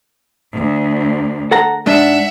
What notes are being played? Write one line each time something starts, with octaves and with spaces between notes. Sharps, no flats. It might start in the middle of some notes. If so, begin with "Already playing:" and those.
D2
A4 F#5 A#5
G#2 D4 E5 F#5